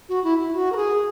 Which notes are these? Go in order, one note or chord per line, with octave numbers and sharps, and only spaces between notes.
F#4
E4
E4
F#4
A#4
G#4